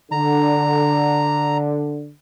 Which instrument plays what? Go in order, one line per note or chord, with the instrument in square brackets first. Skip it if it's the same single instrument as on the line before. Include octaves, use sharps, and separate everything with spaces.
[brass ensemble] D3 [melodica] A#5